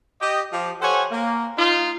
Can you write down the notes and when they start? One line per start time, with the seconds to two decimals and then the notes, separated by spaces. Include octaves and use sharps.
0.21 G4 D#5
0.52 F3 G4
0.81 G4 A4 C5 C#5 F#5 G#5
1.12 A#3
1.57 D#4 F4